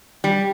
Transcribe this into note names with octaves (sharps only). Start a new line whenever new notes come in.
G3